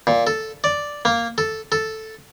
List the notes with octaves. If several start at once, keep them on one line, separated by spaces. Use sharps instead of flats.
A#2
A4
D5
A#3
A4
A4